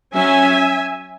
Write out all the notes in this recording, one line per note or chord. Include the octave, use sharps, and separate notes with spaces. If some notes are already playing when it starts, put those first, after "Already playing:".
F#3 C#4 E5 G#5